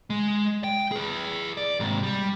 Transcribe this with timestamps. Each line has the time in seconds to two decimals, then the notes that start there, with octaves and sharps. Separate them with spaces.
0.10 G#3
0.64 G5
0.92 G#4 B4
1.57 D5
1.80 G#2 C3
2.03 G3